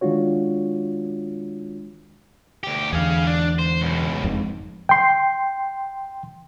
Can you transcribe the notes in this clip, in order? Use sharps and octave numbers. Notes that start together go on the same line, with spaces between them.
D#3 G#3 D4 F4 F#4 C#5
D2 G4
E2 D3 G#4 F5
D4
C5
C#2 B2
F#1 F2 G#2
G5 C6